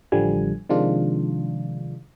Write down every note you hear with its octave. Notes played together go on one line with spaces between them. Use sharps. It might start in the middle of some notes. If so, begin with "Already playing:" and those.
A1 D3 F3 G3 G#5
C3 D#3 F3 G#3 D4 F4